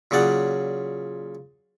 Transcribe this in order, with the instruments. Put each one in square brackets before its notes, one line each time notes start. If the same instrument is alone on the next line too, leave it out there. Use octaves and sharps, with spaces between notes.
[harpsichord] A#2 C#3 F#3 D5 F#5